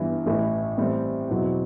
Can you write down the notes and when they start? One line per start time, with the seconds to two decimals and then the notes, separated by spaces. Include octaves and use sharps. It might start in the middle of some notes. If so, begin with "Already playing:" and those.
Already playing: G1 G2 E3
0.26 A1 A2 E3 A3 E4
0.78 A2 E3 G3 C4
1.29 E2 B2 F#3 C4 E4